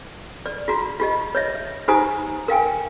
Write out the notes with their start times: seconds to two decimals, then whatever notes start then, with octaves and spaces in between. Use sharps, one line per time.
0.46 D5
0.68 F4 F#4 A#5
1.00 F4 G4 D#5
1.35 C#5 D#5 E5
1.88 D#4 G4 C5 G#5 A#5 D#6
2.48 A#4 F5 G5 G#5